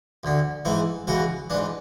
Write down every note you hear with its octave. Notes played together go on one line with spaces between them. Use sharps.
D2 D3
G#2 E3 E4
C#2 C#3 E3 F#4
G#2 E3 D4